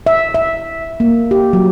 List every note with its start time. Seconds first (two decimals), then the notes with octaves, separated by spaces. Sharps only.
0.06 E5
0.34 E5
1.00 A#3
1.31 G4
1.53 F#3